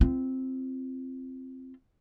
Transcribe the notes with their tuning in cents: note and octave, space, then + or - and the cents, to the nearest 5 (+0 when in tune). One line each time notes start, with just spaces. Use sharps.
C4 +0 F4 -30